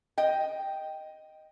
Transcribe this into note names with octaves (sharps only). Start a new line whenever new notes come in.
D#5 G5